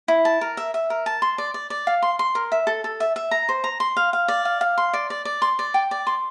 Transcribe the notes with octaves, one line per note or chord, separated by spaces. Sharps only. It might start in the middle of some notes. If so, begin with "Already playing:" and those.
E4
A5
A#4
E5
E5
A#4
A5
C6
D5
D5
D5
F5
C6
C6
A#4
E5
A4
A4
E5
E5
A#5
C5
A#5
C6
F5
F5
D5
F5
F5
C6
D5
D5
D5
C6
D5
G5
D5
C6